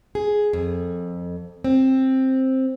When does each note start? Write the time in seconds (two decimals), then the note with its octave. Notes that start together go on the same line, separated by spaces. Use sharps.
0.15 G#4
0.53 F2
1.64 C4